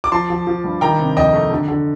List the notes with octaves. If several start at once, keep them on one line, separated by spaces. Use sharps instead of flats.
D6
F3 A5 C6
F3
F3
G2
D#3 G5 A#5
C3
F2 D#5 G5
A3
D3
D3